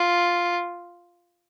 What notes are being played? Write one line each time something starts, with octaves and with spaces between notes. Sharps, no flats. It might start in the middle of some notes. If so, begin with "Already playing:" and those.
Already playing: F4